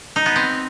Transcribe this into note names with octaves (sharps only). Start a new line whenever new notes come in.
D#4
B3
C4